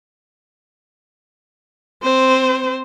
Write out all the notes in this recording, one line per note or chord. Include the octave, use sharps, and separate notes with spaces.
C4 C5